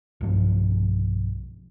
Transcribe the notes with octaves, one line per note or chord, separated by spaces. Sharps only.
B1 G2 F3